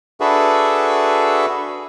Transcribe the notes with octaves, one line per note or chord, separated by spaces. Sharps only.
D4 F#4 G#4 A4 B4 E5